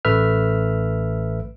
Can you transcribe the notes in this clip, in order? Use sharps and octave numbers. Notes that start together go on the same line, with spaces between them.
A1 A3 B4 E5 F6